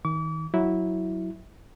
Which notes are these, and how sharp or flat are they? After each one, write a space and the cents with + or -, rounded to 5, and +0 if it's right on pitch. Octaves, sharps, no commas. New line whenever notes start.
D#3 +30 D6 -40
F#3 +0 E4 -10